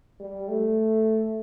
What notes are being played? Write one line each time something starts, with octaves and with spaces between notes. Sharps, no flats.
G3
A3